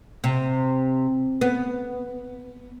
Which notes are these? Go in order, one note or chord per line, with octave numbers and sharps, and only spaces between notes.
C3
B3